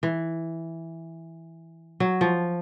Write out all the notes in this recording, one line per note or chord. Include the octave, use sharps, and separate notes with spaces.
E3
F#3
F3